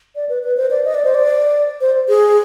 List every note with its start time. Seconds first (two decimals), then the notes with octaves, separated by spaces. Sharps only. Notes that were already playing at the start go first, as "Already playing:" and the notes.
0.16 D5
0.29 B4
0.43 B4
0.57 C5
0.70 D5
0.85 D#5
0.94 D5
1.04 C5
1.14 D5
1.81 C5
2.09 G#4